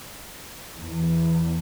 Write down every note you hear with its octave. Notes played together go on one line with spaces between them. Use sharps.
E2